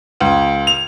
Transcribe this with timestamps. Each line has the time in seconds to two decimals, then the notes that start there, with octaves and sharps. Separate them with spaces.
0.20 C#2
0.67 F7